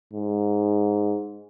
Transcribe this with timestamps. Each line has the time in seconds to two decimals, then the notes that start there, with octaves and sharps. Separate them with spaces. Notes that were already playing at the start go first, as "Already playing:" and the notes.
0.13 G#2